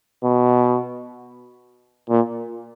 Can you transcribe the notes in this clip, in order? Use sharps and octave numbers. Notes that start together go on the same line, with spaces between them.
B2
A#2